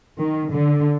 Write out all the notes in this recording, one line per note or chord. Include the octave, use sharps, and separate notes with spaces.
D#3
D3